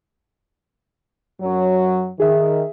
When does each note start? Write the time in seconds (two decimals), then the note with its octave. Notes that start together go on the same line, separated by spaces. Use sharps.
1.42 F#2 F#3
2.20 D#3 G#4 E5